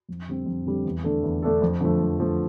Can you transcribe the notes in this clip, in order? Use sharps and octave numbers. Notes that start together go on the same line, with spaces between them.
F2
D3 G3 C4
F2
D3 G3 C4
E2
D3 A3 D4 A4
E2
D3 A3 D4 A4
F2
D3 F3 A3
F2
D3 F3 A3